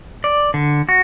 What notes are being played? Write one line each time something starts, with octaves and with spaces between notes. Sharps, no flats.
D5
D3
F#4